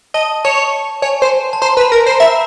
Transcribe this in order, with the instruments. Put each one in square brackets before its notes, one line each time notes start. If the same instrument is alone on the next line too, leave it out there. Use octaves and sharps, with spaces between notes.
[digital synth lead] D#5 [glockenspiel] A5
[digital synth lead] C#5 [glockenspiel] A5
[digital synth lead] C#5 [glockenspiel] G#5
[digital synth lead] C5
[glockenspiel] A5
[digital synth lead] C5 [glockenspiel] A#5
[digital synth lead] B4
[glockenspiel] B5
[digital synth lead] A#4
C5
[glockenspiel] A#5
[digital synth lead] E5 [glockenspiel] B5